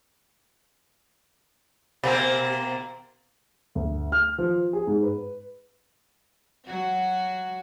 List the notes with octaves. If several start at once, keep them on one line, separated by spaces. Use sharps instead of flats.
B2 A#3 C4
D2
F6
F3
G#4
G#2
B4
F#3 F#4